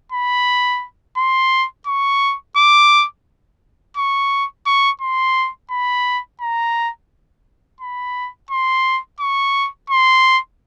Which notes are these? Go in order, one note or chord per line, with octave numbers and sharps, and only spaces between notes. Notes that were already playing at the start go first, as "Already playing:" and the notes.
B5
C6
C#6
D6
C#6
C#6
C6
B5
A#5
B5
C6
C#6
C6